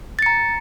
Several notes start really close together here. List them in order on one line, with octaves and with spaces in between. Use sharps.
A6 C#7 A#5